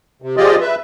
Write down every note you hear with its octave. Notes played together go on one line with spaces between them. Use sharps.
C3
F3 F4 G4 G#4 D5 D#5
B4 E5